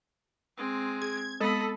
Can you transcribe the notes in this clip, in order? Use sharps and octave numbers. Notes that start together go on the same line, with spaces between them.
G#3 C4
G#4 G#6
G#3 B3 A4 D#5 B5